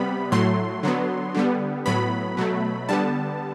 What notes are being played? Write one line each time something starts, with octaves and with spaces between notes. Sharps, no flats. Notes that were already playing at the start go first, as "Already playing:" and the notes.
Already playing: C3 G3 B3 B5
A2 F#3 A3 C6
D3 F#3 B3
D3 G3 B3
A2 F#3 B3 B5
B2 F#3 A3
D3 G3 B3 A5